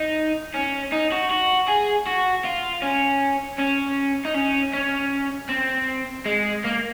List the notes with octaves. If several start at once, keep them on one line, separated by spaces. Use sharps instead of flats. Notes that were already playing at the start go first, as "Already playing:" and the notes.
Already playing: D#4
C#4
D#4
F#4
F#4
G#4
F#4
F4
C#4
C#4
D#4
C#4
C#4
C4
G#3
A#3